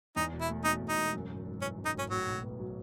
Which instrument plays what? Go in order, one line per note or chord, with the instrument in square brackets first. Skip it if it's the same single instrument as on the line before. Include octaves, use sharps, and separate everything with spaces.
[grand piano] E2 [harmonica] D#4
[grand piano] E1
[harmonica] E4
[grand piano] A3
[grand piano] B2 [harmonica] D#4
[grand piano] E2
[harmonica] D#4
[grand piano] E1
F#2
G#1
G#1
[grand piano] E3 [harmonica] C#4
[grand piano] F#2
[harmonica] D#4
[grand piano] G#1 [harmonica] C#4
[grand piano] A2 [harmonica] F#3
[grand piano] B1
B3
F#3